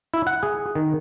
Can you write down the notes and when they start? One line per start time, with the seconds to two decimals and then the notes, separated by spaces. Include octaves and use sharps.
0.14 E4
0.27 F#5
0.43 G#4
0.75 D#3